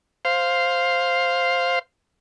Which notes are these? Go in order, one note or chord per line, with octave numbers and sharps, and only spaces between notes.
C5 F5